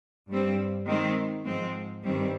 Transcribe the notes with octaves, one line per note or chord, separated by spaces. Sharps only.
G2 G3 C4
D#3 G#3 C4
G#2 F3 G#3 C4
G2 D#3 G3 C4